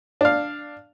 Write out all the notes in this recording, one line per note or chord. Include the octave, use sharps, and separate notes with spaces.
D4 F5